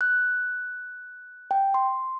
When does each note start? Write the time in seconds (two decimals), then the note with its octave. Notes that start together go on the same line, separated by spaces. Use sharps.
0.01 F#6
1.51 G5
1.74 C6